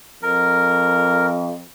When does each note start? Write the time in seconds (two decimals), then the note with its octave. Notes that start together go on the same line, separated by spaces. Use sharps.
0.23 F2 A#4